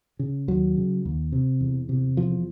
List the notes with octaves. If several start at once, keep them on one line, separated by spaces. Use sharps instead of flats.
C#3
D#2 F#3
C#3
D#2
C3
E2
C3
E2 F3